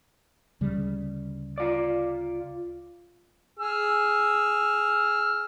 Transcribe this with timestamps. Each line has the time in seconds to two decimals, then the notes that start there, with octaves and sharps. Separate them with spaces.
0.61 D2 C#3 G3
1.58 F4 D5
3.59 G#4 E6 F6